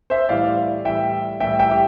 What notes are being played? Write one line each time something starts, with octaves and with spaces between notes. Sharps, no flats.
C5 E5
A2 E3 G3 D5 F5
A2 E3 G3 E5 G5
A2 E3 G3 E5 G5
E5 G5
G4